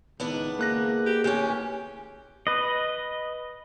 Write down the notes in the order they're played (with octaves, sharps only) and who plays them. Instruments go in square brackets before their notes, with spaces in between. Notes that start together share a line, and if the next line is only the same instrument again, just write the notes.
[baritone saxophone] C#2 [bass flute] D#3 [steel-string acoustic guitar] B3 D4 E4
[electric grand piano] A#3 F#6 A#6 [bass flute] G#4
[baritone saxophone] G4
[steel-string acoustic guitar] D2 E3 C#4 [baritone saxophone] G4
[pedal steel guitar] B4 D#5